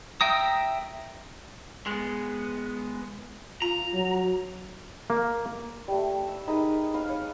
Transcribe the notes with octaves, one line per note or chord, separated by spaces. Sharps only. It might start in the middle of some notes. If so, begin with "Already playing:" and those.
E5 G5 A#5 D#6
G#3 B3
F4 A#5
F#3
A#3
G3 A3
E5
D#4 G#4 A#4 B4
B4 F5 A#5
C#5